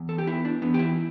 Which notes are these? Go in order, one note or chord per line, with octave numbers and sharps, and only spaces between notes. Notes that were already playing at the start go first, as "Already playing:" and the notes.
Already playing: E2
A4
G4
B3 E4
D4
E2 B3
G4
E4